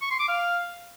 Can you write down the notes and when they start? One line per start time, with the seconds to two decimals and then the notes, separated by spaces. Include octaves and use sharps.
0.02 C#6
0.11 C6
0.20 D6
0.28 F5